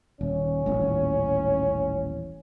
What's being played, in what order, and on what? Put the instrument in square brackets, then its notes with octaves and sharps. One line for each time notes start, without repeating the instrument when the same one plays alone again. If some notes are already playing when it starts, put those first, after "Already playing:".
[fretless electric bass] D#1 [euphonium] C#4
[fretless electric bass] D#1 A1